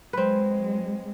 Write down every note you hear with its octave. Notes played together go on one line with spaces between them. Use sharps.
F#3 G#3 C4 B4